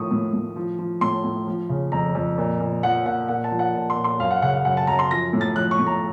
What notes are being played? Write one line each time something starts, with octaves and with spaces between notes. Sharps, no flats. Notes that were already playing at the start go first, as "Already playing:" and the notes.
Already playing: A2 D#3 F3 C#6 D#6
A2
A2
F3
F3
A2 C6
A2
F3
C#3
F2 A#5
F2
A#2
A#2
F3 F#5
A#2 F#5
A#2 F#5
A5
F3
F#5
A#2 A5
C6
A#2
C6
F#2 F5
F#5
C#3 F#5
F#5
F#2 F#5
A5
F#2 A#5
C6
F3 A#6
A2
A6
F3 F#6
C#6
A2
A#5